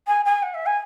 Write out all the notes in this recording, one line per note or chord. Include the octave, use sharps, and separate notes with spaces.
G#5
G#5
F#5
E5
G#5